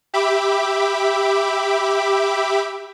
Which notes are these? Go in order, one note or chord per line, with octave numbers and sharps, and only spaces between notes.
G4 E5 B5 D6